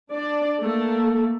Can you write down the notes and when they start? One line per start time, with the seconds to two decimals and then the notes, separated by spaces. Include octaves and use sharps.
0.13 D4 D5
0.60 A3 A#3 A4